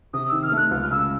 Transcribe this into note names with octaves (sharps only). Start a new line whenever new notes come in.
C3 D#6
D#3 E6
F6
A3 F#6
C#2 F6
C#3 E6